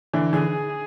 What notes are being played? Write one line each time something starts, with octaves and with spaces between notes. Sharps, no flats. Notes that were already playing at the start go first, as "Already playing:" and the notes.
D3 E3
D3 E3 G#4